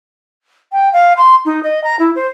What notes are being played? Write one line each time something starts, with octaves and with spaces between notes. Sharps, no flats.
G5
F5
C6
D#4
D#5
A#5
E4
C5